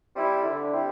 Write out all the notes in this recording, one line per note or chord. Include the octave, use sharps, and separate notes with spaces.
G3 C4 E4
D3
G3 C4 E4